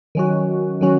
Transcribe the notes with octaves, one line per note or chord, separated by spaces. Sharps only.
D#3 F#3 C#4 F#4
D#3 F#3 C#4 F#4